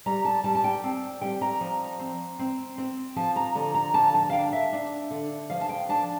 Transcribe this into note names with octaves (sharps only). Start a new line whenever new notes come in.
G3 A#5
A5
G3 A5
A5
G5
C4
G3 G5
A#5
F3
C4
C4
C4
F3 A5
A#5
D3 A#5
A#5
A#3 A5
A5
F5
D4 G5
E5
D4
D3
F3 F5
A5
G5
D4 A5